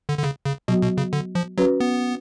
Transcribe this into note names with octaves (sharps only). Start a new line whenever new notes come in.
D3
D3
C#3
C#3
B2 F#3 B3 F#4
B2
C#3
D3
F3
F#3 C#4 F#4 B4
B3